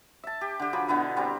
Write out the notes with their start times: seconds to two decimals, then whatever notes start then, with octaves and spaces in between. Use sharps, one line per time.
0.24 E5 A5
0.41 G4
0.60 D3 G4
0.73 F3 F#3 G#4 B5
0.88 B2 D3 B3 E4
1.17 G3 C4 B4 A#5